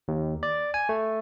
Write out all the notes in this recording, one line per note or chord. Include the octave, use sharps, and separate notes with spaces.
D#2
D5
G#5
A3